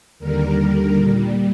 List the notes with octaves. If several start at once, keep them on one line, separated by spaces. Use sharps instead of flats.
D#2 D3 G3 A#4
A#4
A#2 G3